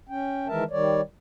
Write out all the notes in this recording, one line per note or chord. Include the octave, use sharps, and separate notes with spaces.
C#4 G5
D#3 E3 G#3 A#4 E5 A5
D#3 G3 C#5 D5